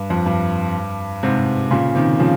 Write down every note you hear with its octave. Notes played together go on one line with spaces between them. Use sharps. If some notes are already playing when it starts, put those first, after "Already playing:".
Already playing: G2
F2
G2
G#2 C3
A#2 C#3
C3 D#3
C#3 F3